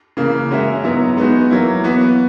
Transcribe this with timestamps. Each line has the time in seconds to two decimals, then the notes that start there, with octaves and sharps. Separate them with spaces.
0.17 C#3 E3 A#3
0.51 G#3 C#4 F#4 A#4 E5
0.84 G#2 F#3 B3 E4
1.17 G#3 B3 D#4 F#4
1.50 F#3 A#3 E4
1.84 E3 B3 F#4